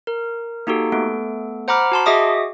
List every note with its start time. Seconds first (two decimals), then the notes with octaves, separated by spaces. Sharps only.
0.07 A#4
0.67 A#3 D#4 F#4 G4 A4
0.92 A3 B3 A4
1.68 C5 F#5 A#5 B5 D6 F6
1.92 F#4 A5 C6
2.06 F#4 G#4 D#5 E5 D6 D#6